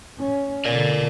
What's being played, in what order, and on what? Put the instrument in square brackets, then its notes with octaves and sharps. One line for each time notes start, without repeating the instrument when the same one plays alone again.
[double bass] C#4
[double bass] B2 D3 [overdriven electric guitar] A#4 D5